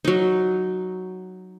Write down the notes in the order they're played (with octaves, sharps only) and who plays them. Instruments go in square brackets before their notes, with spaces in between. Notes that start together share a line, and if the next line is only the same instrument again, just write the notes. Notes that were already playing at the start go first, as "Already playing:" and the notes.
[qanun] F#3 D#4